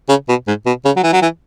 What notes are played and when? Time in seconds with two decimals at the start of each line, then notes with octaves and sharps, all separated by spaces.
0.09 C#3
0.29 B2
0.47 G#2
0.66 B2
0.85 C#3
0.96 F#3
1.03 E3
1.13 F#3
1.22 E3